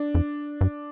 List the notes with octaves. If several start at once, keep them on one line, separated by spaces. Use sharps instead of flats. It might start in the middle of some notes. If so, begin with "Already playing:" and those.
Already playing: D4
F2
G2